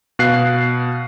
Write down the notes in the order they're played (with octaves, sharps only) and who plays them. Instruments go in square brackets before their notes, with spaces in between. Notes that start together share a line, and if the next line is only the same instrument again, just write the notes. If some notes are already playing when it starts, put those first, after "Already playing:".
[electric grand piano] B2 F5 F#6 C7